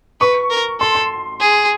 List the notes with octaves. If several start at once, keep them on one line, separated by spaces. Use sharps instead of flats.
B4 C#6
A#4
A4 C6
C6
G#4